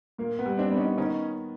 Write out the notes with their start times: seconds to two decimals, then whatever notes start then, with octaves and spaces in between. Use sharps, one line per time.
0.18 A#2 A#3
0.39 B3
0.46 G3
0.58 C4 D4
0.71 B3
0.77 C#4 D#4
0.98 D#3 C#4 D#4